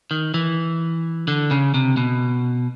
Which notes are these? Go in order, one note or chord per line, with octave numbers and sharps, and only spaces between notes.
D#3
E3
D3
C#3
C3
B2